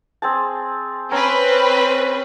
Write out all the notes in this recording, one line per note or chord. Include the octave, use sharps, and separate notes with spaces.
C4 G#4 A5
C4 C#4 B4 A#5